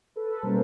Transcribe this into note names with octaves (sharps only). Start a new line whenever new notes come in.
A4 B4
B2 G3 A#3 C#4 A#4 C5